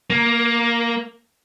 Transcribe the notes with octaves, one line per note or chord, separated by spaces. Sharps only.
A#3